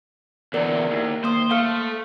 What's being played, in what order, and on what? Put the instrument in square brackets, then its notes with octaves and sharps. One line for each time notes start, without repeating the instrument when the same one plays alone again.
[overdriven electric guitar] E2 D3 [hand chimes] A#4 D5
[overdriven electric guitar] D#2
[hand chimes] A#3 D#6 [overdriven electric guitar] C5
[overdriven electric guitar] A3 [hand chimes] F5 F6